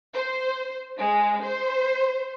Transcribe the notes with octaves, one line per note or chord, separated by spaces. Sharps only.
C5
G#3
C5